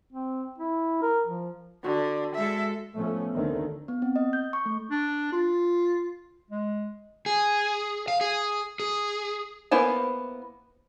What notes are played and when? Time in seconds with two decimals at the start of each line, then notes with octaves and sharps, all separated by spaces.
0.12 C4
0.58 E4
1.02 A#4
1.26 F3
1.84 D3 F#4
2.35 G#3 A4 E5
2.95 A2 F3 A3 B3 C#4
3.35 D2 D3 D#3 A3 C4
3.88 B3
4.02 C4
4.16 D#5
4.33 G6
4.53 C#6
4.66 A3
4.91 D4
5.32 F4
6.51 G#3
7.26 G#4
8.08 F5
8.21 G#4
8.80 G#4
9.71 A#3 B3 E4 C5 G#5